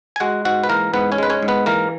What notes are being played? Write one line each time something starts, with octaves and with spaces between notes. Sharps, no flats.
G#5
G#3 F#4 F#5
G#2 F#4 F#5
B4
E3 A#3 A#4
G#2 B3 B4
C#4 C#5
G#3 B4
C#4 C#5
G#2
B3 B4
E3 A#3 A#4